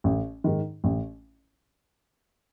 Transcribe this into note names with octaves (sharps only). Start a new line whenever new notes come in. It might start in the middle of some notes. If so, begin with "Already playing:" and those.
A1
G#2 D#3
A1